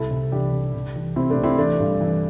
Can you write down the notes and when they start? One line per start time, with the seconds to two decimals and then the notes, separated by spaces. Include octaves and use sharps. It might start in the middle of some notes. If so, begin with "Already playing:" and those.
Already playing: C2 E4 A4
0.11 C2
0.32 E3 D4 G4
0.53 C2
0.74 C2
0.96 E3
1.16 C3 C4 E4
1.30 A3 D4
1.38 C3
1.44 C4 E4
1.58 E3 A3 D4
1.80 G2
2.01 E3